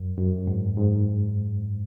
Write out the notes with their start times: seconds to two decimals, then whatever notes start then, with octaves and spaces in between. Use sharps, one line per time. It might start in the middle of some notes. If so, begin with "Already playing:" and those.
Already playing: F#2
0.18 F#2
0.47 G#2
0.77 G#2